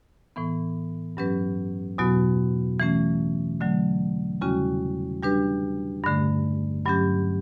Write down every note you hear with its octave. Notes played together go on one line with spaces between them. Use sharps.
A2 E3 B3
G2 F#3 C#4 G4 B4
E2 B2 F#3 B3 F#4
E3 A3 C#4
D3 F#3 A3
E2 C#3 G3 C#4 F#4
G3 D4 G4 B4
G2 D3 A3
G2 F#3 C#4 G4